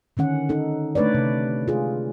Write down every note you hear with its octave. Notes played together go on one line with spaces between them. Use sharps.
D3 D#3 C#4 F#5
D#4 A4
A3 D4 B4 C#5 D5
C3
F4 G#4